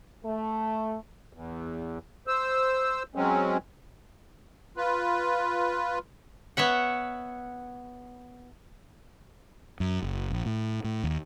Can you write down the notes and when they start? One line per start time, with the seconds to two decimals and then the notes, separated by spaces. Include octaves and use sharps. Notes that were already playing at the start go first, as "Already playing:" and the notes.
0.24 A3
1.33 E2
2.27 C5 E6
3.15 F#3 G#3 C4 C#4
4.77 F4 B4
6.57 B3 C#5 E5 F#5
9.80 F#2
10.03 F#1
10.31 A#1
10.46 A2
10.84 A2
11.04 D#2